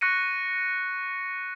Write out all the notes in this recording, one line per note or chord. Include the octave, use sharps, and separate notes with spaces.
C#6 F#6 A#6 C#7 D#7